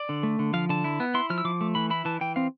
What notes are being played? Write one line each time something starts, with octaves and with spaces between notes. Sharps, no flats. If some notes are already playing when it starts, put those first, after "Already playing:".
Already playing: D5
D3
A3
D3
F3 F5
D3 A5
E4
B3
E4 C6
F3 F6
E6
F3 D6
A3
E3 B5
E4 B5
E3 A5
E3 G5
C4 F5